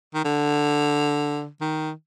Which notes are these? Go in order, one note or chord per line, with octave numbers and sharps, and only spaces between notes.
D#3
D3
D#3